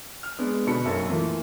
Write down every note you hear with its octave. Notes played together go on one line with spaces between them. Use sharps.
F6
G#3 B3 D4
B2 D3 A4 B5 C#7
B1 F#2 A#3 A4
E3 A3 A#3 F4